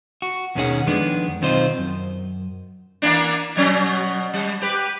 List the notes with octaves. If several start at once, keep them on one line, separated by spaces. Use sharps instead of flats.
F#4
D#2 B2 D#3 C#4 G#4 F#5
F2 D#3 G#3 B3 D4
B1 D#3 C4 F4 C5 D#5
F#2
E3 A#3 D4
B2 F#3 C#4
G3
G4 B4